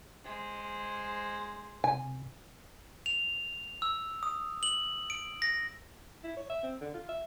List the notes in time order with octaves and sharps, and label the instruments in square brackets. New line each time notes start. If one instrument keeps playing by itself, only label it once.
[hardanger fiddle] G#3 C5
[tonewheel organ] C3 [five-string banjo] G#5
[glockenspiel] F7
E6
D#6
F#7
D7
A#6
[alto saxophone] E4
C#5
E5
C4
D3
F4
E5